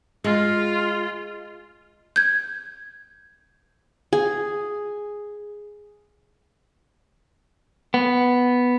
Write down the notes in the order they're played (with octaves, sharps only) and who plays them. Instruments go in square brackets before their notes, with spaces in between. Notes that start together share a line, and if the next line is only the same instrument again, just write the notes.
[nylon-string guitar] G#3 [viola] F4
[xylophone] G6 G#6
[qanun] G#4
[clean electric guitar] B3